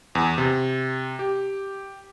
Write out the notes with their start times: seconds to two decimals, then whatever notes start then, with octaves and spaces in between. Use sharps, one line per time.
0.15 E2
0.38 C3
1.19 G4